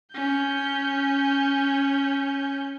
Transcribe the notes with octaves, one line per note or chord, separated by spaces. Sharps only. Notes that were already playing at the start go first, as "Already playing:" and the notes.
C#4 G6